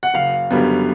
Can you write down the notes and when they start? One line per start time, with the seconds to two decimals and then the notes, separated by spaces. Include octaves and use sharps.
0.03 F#5
0.14 F#1 F5
0.50 F#2 D3 G3 B3